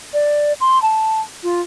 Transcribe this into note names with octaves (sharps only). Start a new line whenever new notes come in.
D5
C6
A5
F4